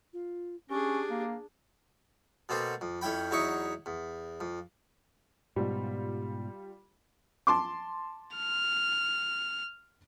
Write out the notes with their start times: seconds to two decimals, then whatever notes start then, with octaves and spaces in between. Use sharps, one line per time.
0.13 F4
0.70 C#4 D4 G4 G#4
1.10 A#3
2.49 B2 A#3 C4 A4
2.81 F2
3.01 F2 C#4 E4 G5 B5
3.31 E2 F#3 D#4 E4 E5 C#6
3.86 E2
4.41 F2
5.56 G#2 B2 G3 F4
7.47 A5 C6 D6
8.36 F6